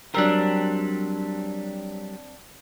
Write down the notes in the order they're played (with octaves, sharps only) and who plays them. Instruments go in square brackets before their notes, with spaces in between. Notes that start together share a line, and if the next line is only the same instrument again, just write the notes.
[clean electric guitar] F#3 G3 A#4 [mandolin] C4 D4